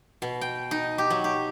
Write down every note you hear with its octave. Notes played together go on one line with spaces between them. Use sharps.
B2
G5
D#4
G4
F#3
G4